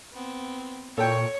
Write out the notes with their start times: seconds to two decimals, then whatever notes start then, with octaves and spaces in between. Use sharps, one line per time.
0.12 B3 C4
0.98 A#2 A4 C#5 G5 C#6